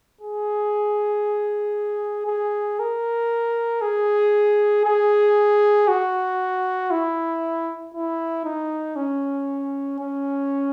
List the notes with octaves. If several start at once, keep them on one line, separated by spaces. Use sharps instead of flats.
G#4
G#4
A#4
G#4
G#4
F#4
E4
E4
D#4
C#4
C#4